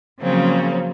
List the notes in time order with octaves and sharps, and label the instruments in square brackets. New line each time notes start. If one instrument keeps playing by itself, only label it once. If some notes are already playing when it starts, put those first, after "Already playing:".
[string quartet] C#3 F3 F#3 A#3 C4 C#4